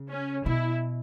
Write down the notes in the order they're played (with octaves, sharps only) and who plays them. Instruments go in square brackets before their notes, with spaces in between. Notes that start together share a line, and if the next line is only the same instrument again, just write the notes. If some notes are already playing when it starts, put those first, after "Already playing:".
Already playing: [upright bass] C#3
[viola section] C#4
[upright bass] B2 [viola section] E4